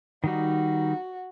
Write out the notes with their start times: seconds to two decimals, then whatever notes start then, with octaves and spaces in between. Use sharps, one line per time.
0.24 D#3 G3 D#4 F#4